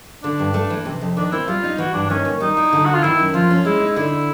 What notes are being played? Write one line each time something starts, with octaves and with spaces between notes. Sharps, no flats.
D3 D4
G2
A3
E3
C3
F2
D#3 D4
C4 E4
G3 F4
D#4
E3 F#4
G2 D4
D#3 C#4
D#2
G3 D#4
E4
D3
D2 F#4
F4
D#3 E4
F#2
F3 F4
C#4
G#3 E4
D#4
D3 E4